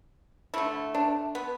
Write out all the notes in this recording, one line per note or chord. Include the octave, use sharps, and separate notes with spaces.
D3 A3 E4
D4
B3